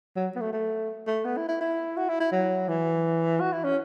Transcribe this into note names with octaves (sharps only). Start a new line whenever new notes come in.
F#3
B3
A3
A3
A3
B3
E4
E4
E4
F#4
E4
E4
F#3
E3
F#4
E4
C#4